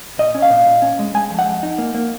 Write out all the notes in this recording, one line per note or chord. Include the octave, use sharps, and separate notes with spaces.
A#2 D#5
C#4
F5
A#2
A#2
C#4
G#3
G#3 G#5
F2
F#5
F2
D#4
A#3
A#3